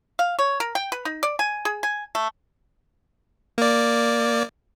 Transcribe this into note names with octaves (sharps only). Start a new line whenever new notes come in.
F5
C#5
A#4
G5
B4
D#4
D5
G#5
G#4
G#5
A3
A#3 D5